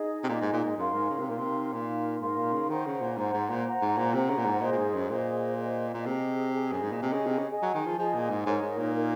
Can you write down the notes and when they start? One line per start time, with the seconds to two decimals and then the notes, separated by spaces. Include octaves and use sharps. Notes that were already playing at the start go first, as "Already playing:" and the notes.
Already playing: D#4 G#4 D#5
0.24 C3
0.29 A#2 D#4 G#4 D#5
0.41 G#2
0.53 A#2
0.65 G#2
0.77 F#2 D#4 A#4 F5 C6
0.93 G#2
1.10 C#3
1.19 C3
1.25 A#2 D#4 A#4 F5 C6
1.38 C3
1.73 A#2 D#4 A#4 F5 C6
2.21 G#2 D#4 A#4 F5 C6
2.37 A#2
2.53 C#3
2.70 D#3 C5 F#5 A#5
2.86 C#3
3.02 A#2
3.17 G#2 C5 F#5 A#5
3.34 G#2
3.50 A#2
3.66 C5 F#5 A#5
3.82 G#2
3.98 A#2
4.14 C3 C5 F#5 A#5
4.30 C#3
4.38 A#2
4.46 G#2
4.61 A#2 G#4 C5 D#5
4.72 A#2
4.78 G#2
4.94 F#2
5.10 A#2 G#4 C5 D#5
5.58 G#4 C5 D#5
5.94 A#2
6.06 C3 G#4 C5 D#5
6.54 G#4 D#5 G#5
6.72 F#2
6.82 G#2
6.92 A#2
7.02 C3 G#4 D#5 G#5
7.14 C#3
7.26 C3
7.38 C#3
7.51 G#4 D#5 G#5
7.63 F#3
7.74 D#3
7.87 F3
7.98 F3 G#4 D#5 G#5
8.15 A#2
8.30 G#2
8.46 G#2 D#4 A#4 C#5
8.62 G#2
8.78 A#2
8.95 D#4 A#4 C#5